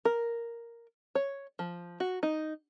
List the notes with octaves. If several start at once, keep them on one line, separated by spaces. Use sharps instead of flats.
A#4
C#5
F3
F#4
D#4